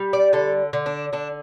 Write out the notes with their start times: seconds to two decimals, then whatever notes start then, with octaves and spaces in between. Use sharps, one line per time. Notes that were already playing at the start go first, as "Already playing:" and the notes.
Already playing: G3
0.13 D5
0.33 D3 A4
0.73 D3
0.86 D4
1.13 D3 D4